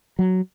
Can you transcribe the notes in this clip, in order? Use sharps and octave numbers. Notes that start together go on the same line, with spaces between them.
F#3